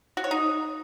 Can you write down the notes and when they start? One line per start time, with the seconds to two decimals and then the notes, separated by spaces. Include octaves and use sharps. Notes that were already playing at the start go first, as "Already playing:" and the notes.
0.17 F#4
0.24 C#5
0.31 D#4